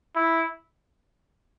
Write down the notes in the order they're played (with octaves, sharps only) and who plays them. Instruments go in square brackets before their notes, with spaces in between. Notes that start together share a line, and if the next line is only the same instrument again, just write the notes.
[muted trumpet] E4